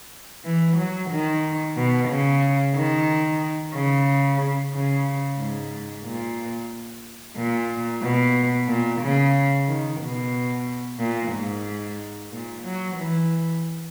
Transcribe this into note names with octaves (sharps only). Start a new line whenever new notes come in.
E3
F#3
D#3
B2
C#3
D#3
C#3
C#3
G#2
A#2
A#2
B2
A#2
C#3
D#3
B2
A#2
G#2
A#2
F#3
E3